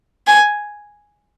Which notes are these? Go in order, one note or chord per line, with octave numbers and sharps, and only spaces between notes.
G#5